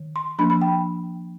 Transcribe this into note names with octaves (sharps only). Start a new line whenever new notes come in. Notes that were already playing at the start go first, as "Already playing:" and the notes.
Already playing: D#3
C6
F3 A#3 D4 B5
B5
G5